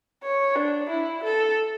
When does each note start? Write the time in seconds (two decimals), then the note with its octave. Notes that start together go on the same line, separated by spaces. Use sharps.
0.24 C#5
0.56 D4
0.90 E4
1.24 A4